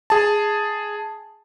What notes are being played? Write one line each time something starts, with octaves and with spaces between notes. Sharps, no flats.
G#4 A5